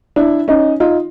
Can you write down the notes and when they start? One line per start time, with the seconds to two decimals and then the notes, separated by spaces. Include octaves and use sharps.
0.16 D4 E4
0.48 C#4 D#4
0.80 D#4 F4